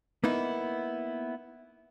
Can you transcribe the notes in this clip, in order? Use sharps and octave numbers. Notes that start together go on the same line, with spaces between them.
A#3 B3 D#4 E4